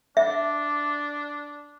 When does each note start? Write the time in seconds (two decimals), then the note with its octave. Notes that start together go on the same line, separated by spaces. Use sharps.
0.17 D4 E5